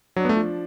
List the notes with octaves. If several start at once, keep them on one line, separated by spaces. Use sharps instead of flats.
F#3 D4
B3
A3
F3